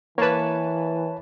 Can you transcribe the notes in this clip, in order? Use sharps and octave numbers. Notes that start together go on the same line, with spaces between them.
E3 A#3 B4 C#5 A5